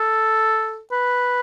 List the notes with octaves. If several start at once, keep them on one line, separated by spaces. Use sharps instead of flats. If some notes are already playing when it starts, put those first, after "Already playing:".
Already playing: A4
B4